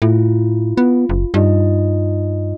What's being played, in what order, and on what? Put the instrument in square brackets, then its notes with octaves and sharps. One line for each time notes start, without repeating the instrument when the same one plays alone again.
[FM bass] A2 [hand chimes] E4 F4
[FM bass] B3 [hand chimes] F4
[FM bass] F#1
[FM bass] G2 [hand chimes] D#4 F4 D#5